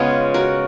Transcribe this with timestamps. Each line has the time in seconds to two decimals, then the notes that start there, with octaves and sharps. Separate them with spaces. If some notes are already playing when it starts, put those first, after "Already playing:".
Already playing: C#3 G#3 B3 F4 G#4
0.34 F#4 A#4